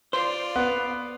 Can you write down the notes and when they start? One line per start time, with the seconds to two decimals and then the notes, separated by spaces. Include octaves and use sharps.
0.13 F4 C5 D5
0.56 B3